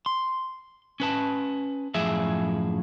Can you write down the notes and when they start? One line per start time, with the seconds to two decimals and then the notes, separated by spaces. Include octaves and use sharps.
0.06 C6
1.00 C#4 B4 A5
1.94 F#2 A2 F3 G#4 E5